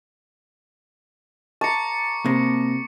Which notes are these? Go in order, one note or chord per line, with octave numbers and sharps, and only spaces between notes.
A5 A#5 C#6 D6 C#7
C3 A#3 A#6